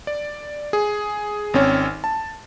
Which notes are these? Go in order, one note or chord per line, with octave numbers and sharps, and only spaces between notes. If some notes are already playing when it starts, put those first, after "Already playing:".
D5
G#4
G#1 C4 C#4 C#5
A5